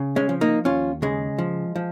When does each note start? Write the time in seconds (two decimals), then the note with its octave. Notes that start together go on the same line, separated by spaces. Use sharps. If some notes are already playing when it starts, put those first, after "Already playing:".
Already playing: C#3
0.16 G#3 C#4
0.29 F3
0.41 A#3 D#4
0.65 D#2 C#4 F4
1.02 C#3 G#3
1.38 F3
1.76 F3